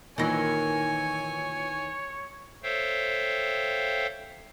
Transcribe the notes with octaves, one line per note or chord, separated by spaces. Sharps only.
A#2 D#3 E3 D#4 C#5 G#5 A#6
A4 C5 C#5 E5 F5 G5